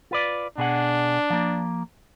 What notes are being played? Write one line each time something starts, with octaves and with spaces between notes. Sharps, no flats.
F4 B4 D5
B2 D4 G#4 F#5
F3 A#3